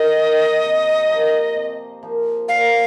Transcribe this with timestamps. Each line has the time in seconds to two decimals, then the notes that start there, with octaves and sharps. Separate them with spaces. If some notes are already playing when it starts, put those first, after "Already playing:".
Already playing: D#3 D#5
0.17 A#3 D#4
0.64 C3
1.09 F3 A#3 D#4
1.56 C3
2.03 F3 A#3 D#4
2.48 A#2 F5